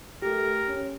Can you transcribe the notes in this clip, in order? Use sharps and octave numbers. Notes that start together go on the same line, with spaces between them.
A3 G4 A#4
C#4